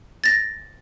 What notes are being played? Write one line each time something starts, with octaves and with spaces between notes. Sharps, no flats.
A6 A#6